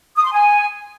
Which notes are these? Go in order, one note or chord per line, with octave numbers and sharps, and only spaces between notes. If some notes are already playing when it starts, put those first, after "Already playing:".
D#6
C6
G#5